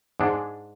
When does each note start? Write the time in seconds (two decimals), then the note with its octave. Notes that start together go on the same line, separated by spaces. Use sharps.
0.20 G#2 G#3 D4